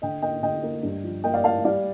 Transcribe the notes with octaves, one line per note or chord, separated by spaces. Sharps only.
D3 D#5 G5
A#3 D#5 G5
D3 D#5 G5
A#3
G2
F3
A#3 D#5 G5
D5 F5
A#3 F5 A5
G3 D5 F5